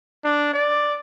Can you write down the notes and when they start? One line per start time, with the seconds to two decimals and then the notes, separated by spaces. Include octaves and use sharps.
0.24 D4
0.53 D5